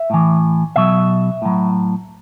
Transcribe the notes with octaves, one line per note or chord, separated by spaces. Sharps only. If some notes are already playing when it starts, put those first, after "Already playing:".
Already playing: E5
A2 E3
B2 F#3 E5
A2 F#3